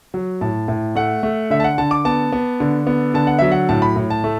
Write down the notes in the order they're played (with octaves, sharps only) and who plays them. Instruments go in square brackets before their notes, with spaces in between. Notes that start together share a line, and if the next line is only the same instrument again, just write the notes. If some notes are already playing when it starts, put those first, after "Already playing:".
[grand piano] F#3
A2 A5
A2
A3 F#5
A3
D3 E5
A5
F#5
D3 A5
D6
B3 A5
B3
D3
B3
D3 A5
F#5
F#3 E5
F#5
A2 A5
B5
A2
A5
A3